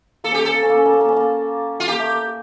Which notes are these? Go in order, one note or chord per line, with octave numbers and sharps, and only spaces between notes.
A#3 A4
C#4 G4
A#3
C#4 A4
A#3
C#4
A#3
C#4
A#3
C#4
A#3
C#4
A#3
F4
A#3 G4
A3
A#3